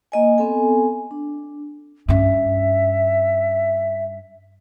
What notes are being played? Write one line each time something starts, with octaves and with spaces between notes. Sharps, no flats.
A#3 D#5 G#5
B3 C4 A4 G#5
D4
G2 C#4 E5